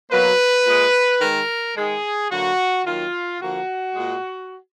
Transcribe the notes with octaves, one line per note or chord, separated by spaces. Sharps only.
B2 F#3 A#3 B4
A#2 G#3
D#3 G#3 A#4
D#3 G#3 G#4
D3 F#3 A#3 F#4
D#3 F#3 A#3 F4
D3 F3 A#3 F#4
A#2 G#3